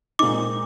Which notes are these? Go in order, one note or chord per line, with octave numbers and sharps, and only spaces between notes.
A#2 G#3 C4 D#4 D6